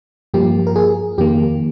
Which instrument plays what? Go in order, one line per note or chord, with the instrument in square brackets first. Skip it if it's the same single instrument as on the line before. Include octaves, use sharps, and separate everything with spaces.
[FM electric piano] G2 F3 A#3 G4
A#4
G#4
F2 D#3 A#3 G4